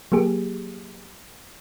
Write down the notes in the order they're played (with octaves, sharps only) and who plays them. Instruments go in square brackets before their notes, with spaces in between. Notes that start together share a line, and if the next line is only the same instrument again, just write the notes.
[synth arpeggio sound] F#3 A#3 G4 G#4